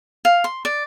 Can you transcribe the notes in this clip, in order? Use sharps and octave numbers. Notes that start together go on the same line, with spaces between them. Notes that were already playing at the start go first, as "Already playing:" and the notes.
F5
C6
D5